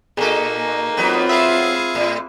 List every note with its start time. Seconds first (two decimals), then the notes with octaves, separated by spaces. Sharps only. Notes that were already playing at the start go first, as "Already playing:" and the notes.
0.17 A#2 A#3 D#4 G#4 A4
0.97 F#3 B3 C4 F4
1.29 G#4 E5 F5 B5 E6
1.95 A2